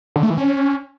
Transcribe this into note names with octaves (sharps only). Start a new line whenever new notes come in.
D3
A3
E3
C#4